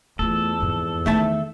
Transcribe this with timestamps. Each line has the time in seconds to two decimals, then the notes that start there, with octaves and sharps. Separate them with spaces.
0.19 E2 A3 F4 A4
0.60 F2 G#2
1.06 D#3 A3 D#4 E5 A5